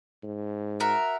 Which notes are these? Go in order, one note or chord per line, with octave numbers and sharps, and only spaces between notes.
G#2
F#4 A#4 E5